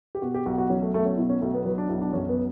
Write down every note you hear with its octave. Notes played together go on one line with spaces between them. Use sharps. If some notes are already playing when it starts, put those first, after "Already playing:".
G4
B2 F#4
G4
B1 F#4
F#4
F#3 C#4
A3
B1 A3
C#4
B2 E4
C#4
B1 A3
B3
F#3 B3
D4
B1 E4
D4
F#2 C#4
B3